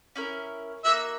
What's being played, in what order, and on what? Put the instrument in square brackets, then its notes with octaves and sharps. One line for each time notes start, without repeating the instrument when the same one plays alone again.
[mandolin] C#4 E4 A#4
[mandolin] A#3 D#4 F#4 [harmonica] E5